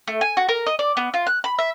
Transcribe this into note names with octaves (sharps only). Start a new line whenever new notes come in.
A3
G#5
F#4
A#4
D#5
D5
B3
F4
F#6
B5
E5